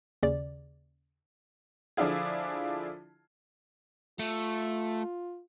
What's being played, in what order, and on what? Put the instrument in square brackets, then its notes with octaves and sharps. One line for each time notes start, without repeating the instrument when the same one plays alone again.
[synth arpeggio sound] D#2 C#3 D5
[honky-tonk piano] D3 F3 D4 E4 F4 G#4
[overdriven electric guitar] A3 [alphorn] F4